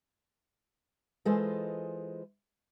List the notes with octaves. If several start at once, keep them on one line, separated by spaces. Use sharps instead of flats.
E3 G#3 F4 A4 C5 D#5